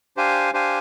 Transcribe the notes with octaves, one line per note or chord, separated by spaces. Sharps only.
D4 G4 C5 F5 G#5
D4 G4 C5 F5 G#5